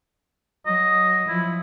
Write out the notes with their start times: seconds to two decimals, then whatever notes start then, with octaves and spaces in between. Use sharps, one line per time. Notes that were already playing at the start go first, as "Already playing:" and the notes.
0.66 F#3 D#5
1.29 F3 E4